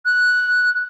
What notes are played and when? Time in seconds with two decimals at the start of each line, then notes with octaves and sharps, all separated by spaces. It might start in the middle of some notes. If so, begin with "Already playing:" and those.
0.06 F#6